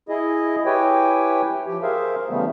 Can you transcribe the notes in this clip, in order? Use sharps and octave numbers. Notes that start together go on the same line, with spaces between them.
E4 G#4 D#5
E4 G4 B4 C#5 G5 G#5
F3 G4
G#4 A#4 C5 E5 F5
C#3 E3 G3 A3 B3